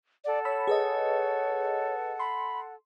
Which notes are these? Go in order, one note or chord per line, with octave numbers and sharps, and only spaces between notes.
A4 D5 F#5
C#5 B5 E6
G#4 B4 D#5
B5 C6